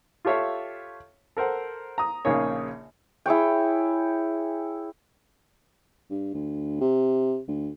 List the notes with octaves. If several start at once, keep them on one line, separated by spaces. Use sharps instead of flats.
F4 G4 A4 C#5 E5 F5
A4 A#4 C5 F#5
A#5 D#6
A#1 C#3 A#3 D#4 G#4 C#5
E4 G#4 C#5 G5
G2
D2
C3
D2